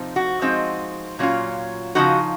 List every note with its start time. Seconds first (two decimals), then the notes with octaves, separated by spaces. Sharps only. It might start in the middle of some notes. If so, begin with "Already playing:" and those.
Already playing: C3 F3 C4 D#4
0.16 F#4
0.41 F3 G#3 C4 D#4
1.19 A#2 F#3 C#4 F4
1.95 C#3 F3 G#3 C4 D#4 F#4